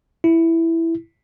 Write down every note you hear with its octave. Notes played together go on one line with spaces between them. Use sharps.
E4